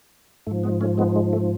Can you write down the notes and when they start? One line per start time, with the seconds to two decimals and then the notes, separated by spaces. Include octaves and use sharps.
0.47 G#2 F3 A3
0.63 G#3 B3
0.81 A3 C#4
0.98 G#3 B3
1.16 G#3
1.33 A3